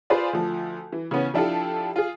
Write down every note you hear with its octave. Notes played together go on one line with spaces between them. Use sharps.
F4 G#4 B4 C5 D5 F5
D2 F3
E3
C#3 E3 B3 C#4
F3 D4 E4 F4 G4 A4
F4 G#4